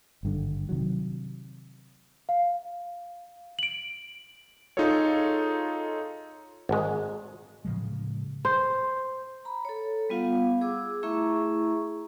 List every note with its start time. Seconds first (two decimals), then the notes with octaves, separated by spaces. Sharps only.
0.23 G#1 G2 D3
0.69 C3 D#3 F#3
2.29 F5
3.59 D7 F#7
4.77 D#4 F4 G#4 A4 C#5
6.69 G#1 G#3
7.65 A2 C#3 F3 G#3
8.45 C5
9.45 A#5 B5
9.65 A4 C#5
10.09 G3 B3 F4 F5 F#5
10.61 G#4 D6 E6
11.03 A3 E4 G#4 E5 A#5 C#6